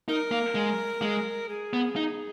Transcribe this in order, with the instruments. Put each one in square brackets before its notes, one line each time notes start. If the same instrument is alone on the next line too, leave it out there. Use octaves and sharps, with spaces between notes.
[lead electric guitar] D#4 [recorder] A#4
[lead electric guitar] A#3
G#3
G#3
[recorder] G#4
[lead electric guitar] B3
D#4